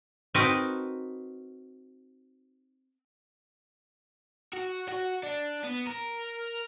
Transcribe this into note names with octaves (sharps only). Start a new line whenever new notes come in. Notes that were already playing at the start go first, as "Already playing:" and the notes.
C4 D#4 F#4 A#4 B4 A5
F#4
F#4
D4
B3
A#4